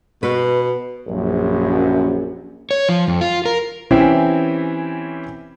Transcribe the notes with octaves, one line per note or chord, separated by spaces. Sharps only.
B2 B4
A#1 F#2
C#5
F3
F2
F4
A#4
E3 C4 C#4 E4 G4